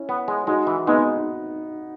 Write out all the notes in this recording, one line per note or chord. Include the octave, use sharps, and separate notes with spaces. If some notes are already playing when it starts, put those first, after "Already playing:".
Already playing: C#4 E4
B3
G#3
G#3 D#4 F#4
E3
G#3 B3 D#4